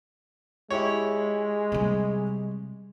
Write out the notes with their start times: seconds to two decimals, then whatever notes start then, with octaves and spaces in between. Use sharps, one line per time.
0.70 G#3 E4 G4 C#5
1.72 C3 G3